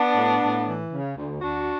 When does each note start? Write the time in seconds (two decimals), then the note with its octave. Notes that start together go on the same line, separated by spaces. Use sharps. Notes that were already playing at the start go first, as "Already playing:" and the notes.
Already playing: B3 D4
0.16 A2
0.41 A2
0.67 E3
0.91 C#3
1.16 D2
1.41 D2 D4 F#4